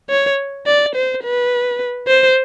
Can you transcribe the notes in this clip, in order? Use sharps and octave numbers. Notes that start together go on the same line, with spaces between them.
C#5
D5
C5
B4
C5